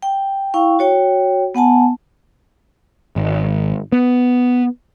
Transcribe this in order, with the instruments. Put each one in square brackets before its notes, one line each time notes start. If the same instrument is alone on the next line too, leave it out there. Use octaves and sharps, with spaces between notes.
[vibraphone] G5
E4 F5 G5 C#6
F#4 C#5 G5
B3 F#5 G#5 A5
[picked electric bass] G#1
B3